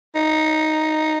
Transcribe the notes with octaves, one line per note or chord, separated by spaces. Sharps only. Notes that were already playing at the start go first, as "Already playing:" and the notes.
D#4